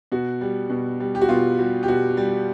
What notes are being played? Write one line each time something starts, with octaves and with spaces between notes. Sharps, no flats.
B2 F#4
G3
B2
G3
G4
F#4
B2 F4
G3 F#4
G4
B2 F#4
G3